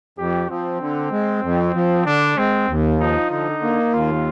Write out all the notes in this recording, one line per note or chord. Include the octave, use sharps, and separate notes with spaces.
F2 G4
F3 C4
D3
G#3
F2
F3
D3 D4
G#3 C4
D#2
F3 D#4
D3 D#4
A#3
D#2 F4